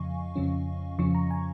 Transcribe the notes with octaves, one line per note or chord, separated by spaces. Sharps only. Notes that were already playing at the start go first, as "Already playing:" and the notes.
Already playing: F2 C#3 F3 D#5 F5 G#5 C#6
F2 C#3 F3 C#4
F2 C#3 F3 C#4 C#6
A#5
G#5